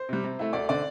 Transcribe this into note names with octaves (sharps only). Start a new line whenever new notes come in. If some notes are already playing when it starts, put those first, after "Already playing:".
Already playing: C5
C3 G3
C3
A3 E4
D2 D5
D3 C4 D5